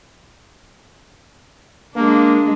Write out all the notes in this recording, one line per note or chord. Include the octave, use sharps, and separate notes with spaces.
G#3 A#3 D4